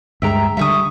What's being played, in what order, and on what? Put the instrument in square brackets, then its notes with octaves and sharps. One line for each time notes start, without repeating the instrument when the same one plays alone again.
[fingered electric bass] D2 G2 G#3 [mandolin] E5 G5 A#5
[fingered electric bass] D3 G3 [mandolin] E5 C#6 D#6